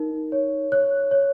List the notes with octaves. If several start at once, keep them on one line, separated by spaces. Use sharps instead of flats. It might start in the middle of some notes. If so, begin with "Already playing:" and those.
Already playing: D#4 A#4
C#5
C#5 F#6
C#5